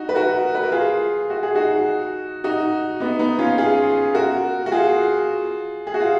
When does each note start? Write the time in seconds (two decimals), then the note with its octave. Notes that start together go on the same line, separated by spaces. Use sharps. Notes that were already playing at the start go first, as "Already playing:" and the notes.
Already playing: D#4 F#4
0.09 B4
0.15 F#4 A#4
0.55 B4
0.64 A#4
0.72 F4 G#4
1.30 F#4
1.43 G#4
1.54 D#4 F#4
2.44 D#4 F#4
3.00 B3 D#4
3.19 B3 D#4
3.39 C#4 F4
3.58 F4 G#4
4.14 F#4 A#4
4.66 F#4
4.72 F4 G#4
5.87 G#4
5.94 F#4
6.01 F4